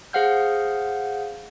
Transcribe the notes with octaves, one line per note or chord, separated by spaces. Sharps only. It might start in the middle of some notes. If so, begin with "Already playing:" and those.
G#4 C5 F5 F#5 F6 G6